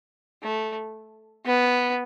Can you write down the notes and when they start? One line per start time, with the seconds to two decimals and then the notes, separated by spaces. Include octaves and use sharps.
0.43 A3
1.46 B3